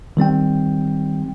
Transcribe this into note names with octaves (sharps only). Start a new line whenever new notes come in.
D#3 G3 C4 G5